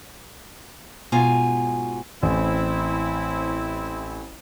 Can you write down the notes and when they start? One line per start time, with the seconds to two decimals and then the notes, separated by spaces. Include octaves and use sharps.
1.12 G#2 B2 F4 G#5 A#5
2.23 A1 C4 E4